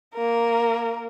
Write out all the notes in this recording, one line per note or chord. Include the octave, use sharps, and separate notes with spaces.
A#3 A#4